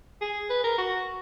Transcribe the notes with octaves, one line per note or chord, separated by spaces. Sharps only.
G#4
B4
A#4
F#4